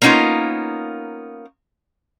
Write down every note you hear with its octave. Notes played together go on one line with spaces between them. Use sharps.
A#3 B3 C#4 D#4 F4 A#4